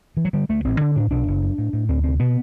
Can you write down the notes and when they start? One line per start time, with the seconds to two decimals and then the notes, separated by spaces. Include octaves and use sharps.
0.17 E3
0.25 F#3
0.33 D3 G3
0.49 D2 A3
0.64 A1 C4
0.81 D3 D4
0.95 A2 D4
1.11 B1 D4
1.27 F#1
1.42 F#2
1.58 A2
1.73 A2
1.89 D2 C4
2.04 C3 C4
2.20 B2 B3